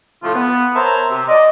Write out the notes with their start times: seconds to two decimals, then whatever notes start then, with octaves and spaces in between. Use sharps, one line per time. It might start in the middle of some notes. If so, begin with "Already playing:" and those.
0.23 A2 C3 F3 A3 F4
0.35 B3
0.75 A#4 C5 C#5 E5 A5 A#5
1.10 C3
1.28 D5 D#5